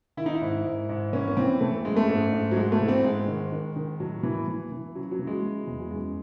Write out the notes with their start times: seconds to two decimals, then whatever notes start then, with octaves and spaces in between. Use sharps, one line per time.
0.17 D#3 E4
0.26 D#4
0.35 E4
0.41 G#2
0.65 G#2
0.89 G#2
1.13 E3 C#4
1.28 C#4
1.37 E3 C4
1.61 E3 A3
1.85 F#2 G#3
1.97 A3
2.09 G#2
2.33 G#2
2.51 F#3
2.56 G#2 G#3
2.72 A3
2.80 E3
2.88 C4
3.04 G#2 G#3
3.28 D#3
3.52 D#3
3.76 D#3
4.00 A2 F#3
4.23 E3
4.48 E3
4.72 E3
4.95 C#3 F#3
5.11 F#3
5.19 E3
5.27 G#3
5.43 E3
5.67 E2
5.80 F#3
5.91 F#2 G#3